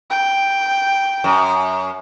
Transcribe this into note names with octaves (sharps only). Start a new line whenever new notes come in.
G5
F#2